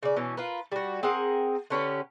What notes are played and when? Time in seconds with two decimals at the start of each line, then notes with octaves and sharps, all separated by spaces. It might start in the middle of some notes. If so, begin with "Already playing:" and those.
0.03 C#3 D5
0.16 B2 E3 C#4
0.37 F4 A#4 B4
0.72 G3 F#4
1.03 C4 G#4 A#4 F#5
1.70 D3 C#4 G4 B4